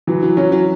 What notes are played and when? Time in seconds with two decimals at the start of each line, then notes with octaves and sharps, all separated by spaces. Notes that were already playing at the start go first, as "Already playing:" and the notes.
0.07 E3 F#3
0.23 F#3
0.37 F#3 C#4
0.52 F#3